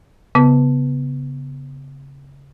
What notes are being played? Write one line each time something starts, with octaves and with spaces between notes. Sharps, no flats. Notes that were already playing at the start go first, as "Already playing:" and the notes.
C#3 B3